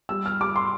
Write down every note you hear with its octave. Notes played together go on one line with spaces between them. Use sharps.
G3 E6
F6
G3 D6
C6